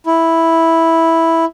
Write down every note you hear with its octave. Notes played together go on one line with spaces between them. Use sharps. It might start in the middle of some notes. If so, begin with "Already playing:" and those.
E4